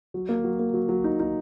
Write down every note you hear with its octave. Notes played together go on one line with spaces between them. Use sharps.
F#3
A#3
F#3
A#3
F#3
F#3
D#4
D#4